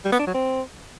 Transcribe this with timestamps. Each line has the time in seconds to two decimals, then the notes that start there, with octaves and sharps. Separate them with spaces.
0.05 G3
0.12 B3
0.19 D4
0.27 F#3
0.34 C4